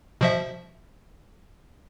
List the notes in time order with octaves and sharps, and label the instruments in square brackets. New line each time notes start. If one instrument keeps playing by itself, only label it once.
[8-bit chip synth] B2 F3 E5